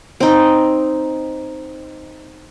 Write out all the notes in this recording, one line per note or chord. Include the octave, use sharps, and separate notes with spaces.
C4 D#4